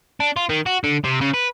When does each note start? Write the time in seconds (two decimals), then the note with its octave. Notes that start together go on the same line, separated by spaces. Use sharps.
0.20 D4
0.37 F4
0.50 D#3
0.66 F#4
0.84 D3
1.04 C3
1.21 C#3
1.34 B4